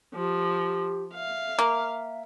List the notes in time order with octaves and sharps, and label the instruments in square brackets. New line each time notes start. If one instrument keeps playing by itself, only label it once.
[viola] F3 [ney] G4
[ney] E5 [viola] F5
[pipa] A#3